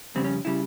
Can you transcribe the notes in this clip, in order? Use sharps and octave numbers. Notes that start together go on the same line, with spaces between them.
F2 C#3 G3 C4
C#4
C#3 G3 E4